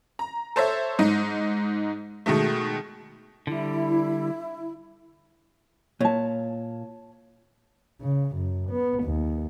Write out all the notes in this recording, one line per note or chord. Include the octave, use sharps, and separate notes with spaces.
A#5
A4 C5 C#5 E5
G#2 D#4
B2 D#3 G#3 A3
D3 G3 E4
A#2 C#5 A5
C#3
F#2
B3
D#2